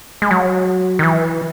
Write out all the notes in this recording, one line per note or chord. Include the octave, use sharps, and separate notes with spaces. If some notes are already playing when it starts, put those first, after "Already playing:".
G#3
F#3
D#3
E3